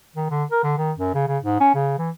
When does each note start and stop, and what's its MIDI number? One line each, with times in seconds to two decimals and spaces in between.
0.16 0.28 51
0.30 0.44 50
0.51 0.63 70
0.63 0.76 50
0.77 0.92 51
0.98 1.12 42
1.14 1.24 49
1.28 1.38 49
1.43 1.59 44
1.60 1.71 61
1.75 1.94 49
1.99 2.10 52